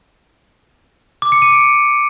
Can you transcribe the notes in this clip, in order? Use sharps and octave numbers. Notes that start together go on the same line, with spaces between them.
D6
C#7
D#7
D7